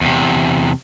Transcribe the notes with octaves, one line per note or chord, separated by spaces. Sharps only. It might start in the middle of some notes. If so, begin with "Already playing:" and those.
E2 C3